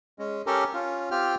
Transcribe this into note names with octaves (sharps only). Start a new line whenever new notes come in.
G#3 C#4
C#4 G4 A4 A#4
C#4 F4
C4 F4 G4 G5 F6